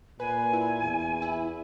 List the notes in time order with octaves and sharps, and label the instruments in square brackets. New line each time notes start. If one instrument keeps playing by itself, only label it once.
[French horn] A#2 [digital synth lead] B4 [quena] G#5
[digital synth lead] E4
[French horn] E2
[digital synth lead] E4